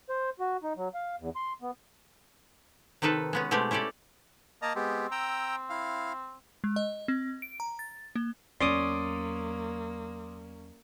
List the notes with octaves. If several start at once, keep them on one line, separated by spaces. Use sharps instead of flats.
C5
F#4
D#4
F#3
F5
E2
C6
B3
C3 D#3 D#4 A4 B4
G#3 B3 C#4
B2 G#3 A3 C4 G4
C#4 E4 G4 A4 D5
A#3 D#5 A5 A#5
G#3 B3 C4 G4
G5 A#5 E6
E4 F5
G#3
D#5
C4
D7
A#5
A6
A#3
E2 F#3 A#3 C#4 D5 C6 D6 D#6